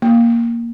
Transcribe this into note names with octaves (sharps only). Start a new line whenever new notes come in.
A#3